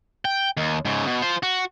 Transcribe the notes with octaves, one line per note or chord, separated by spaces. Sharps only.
G5
D#2
G#2 C#3
B2
F4 C5
F#4